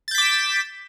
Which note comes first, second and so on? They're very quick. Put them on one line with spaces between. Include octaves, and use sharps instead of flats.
A6 G6 B6 D6 E7